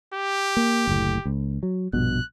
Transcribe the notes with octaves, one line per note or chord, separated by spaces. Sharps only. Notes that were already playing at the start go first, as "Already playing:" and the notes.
G4
A#3
F#1 D2 A2
C#2
F#3
A#1 G2 B2 F#6